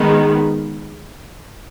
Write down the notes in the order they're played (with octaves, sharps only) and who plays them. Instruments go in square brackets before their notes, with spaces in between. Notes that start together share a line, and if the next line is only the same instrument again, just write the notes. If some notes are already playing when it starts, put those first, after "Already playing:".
Already playing: [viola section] D#3 G#3 B3